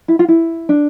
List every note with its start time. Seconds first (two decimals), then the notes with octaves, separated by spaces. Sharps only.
0.08 E4
0.19 F4
0.28 E4
0.69 D4